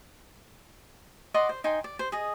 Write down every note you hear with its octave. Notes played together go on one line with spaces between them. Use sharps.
D5 D#5 F#5 C6
C5
D#4 G5 G#5 C6
D5
C5
G#4 D#5